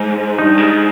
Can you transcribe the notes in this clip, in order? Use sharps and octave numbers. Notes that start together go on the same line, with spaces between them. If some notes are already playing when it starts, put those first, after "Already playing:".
Already playing: G#2
G2 D#4
G#2